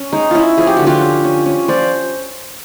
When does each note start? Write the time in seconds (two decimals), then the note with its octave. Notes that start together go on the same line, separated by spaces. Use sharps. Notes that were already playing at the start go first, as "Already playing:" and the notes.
Already playing: C#4
0.13 G#3 D#4
0.31 C#4 E4 F4
0.57 F3 G#4
0.67 G4
0.77 D3 F#4
0.87 F4 G4
1.01 C#4
1.24 C#4
1.46 C#4
1.68 F3 C5 D5